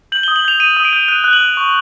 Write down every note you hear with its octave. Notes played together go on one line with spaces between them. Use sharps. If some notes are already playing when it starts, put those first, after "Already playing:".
G6 F#7
D#6 G7
F#7
G6 F7
G6 D#7
D#6
D7
G6
F#6 D#7
F#6
F#7
F#6
C#6